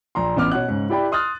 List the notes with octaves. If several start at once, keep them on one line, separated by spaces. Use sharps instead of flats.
A#1 A#5 C6
A1 B3 D6 F6
B2 C#5 F#5 F#6
G#2 C#3 C#4
E4 G4 D5 G5 B5
C6 D#6 F6 F#6 A6